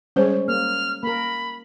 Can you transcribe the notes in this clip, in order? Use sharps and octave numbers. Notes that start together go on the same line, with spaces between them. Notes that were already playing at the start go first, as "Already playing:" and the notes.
G3 G#3 C#4 C5
A#3 F6
A#3 A#4 B5